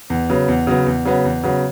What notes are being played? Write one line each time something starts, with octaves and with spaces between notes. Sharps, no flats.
E2
C#3 F#3 B3
E2
C#3 F#3 B3
E2
C#3 F#3 B3
E2
C#3 F#3 B3